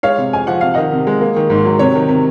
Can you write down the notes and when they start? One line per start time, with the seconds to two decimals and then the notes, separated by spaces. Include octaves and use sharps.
0.03 G#3 C#5 F5
0.18 C3
0.33 F2 G#5
0.47 F3 F#5
0.61 C3 F5
0.74 D#3 D#5 F#5
0.92 C3
1.07 G#3
1.21 A#3
1.36 D#3
1.50 G#2
1.65 F#3
1.79 C3 C#5
1.95 D#3
2.09 C3